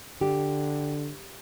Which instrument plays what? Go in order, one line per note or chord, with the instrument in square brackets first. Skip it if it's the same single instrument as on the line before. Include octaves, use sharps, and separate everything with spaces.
[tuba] D3 [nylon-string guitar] G4